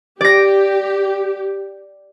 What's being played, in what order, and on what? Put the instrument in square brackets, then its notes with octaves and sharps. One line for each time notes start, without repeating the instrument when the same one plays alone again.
[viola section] G4 [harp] D5 A#6